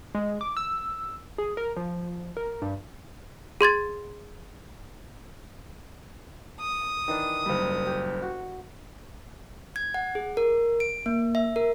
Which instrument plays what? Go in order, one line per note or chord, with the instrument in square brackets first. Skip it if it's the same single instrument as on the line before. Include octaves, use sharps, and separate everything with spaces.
[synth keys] G#3
D6
E6
G#4
A#4
F3
A#4
G2
[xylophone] G#4 C6 G#6 A6
[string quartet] D#6
[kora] D#3 E3 D4
[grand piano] F#1 G3
[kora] G4
F#4
[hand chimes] G#6
F#5
G#4
A#4
D7
A#3
E5
A#4